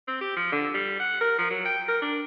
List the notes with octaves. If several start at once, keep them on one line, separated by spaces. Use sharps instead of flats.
C4
G4
F3
D3
G3
F#5
A#4
F3
F#3
G5
A#4
D4